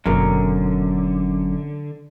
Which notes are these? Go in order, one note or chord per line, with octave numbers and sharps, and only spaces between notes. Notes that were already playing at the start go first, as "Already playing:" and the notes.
F#1 F#2 B2 D3 F#3 A#4